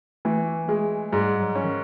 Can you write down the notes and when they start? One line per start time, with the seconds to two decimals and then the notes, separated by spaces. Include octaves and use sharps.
0.25 E3 A3
0.68 G#3 A3
1.12 G#2 G3
1.41 F#3
1.55 C#4
1.64 D#3